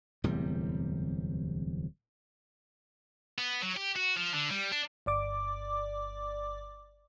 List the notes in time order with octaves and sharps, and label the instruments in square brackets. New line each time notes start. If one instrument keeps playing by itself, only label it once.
[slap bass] D1 E2 C3 G3
[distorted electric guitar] B3
F#3
G4
F#4
F3
D3
G3
D4
[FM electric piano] G1 D5 D6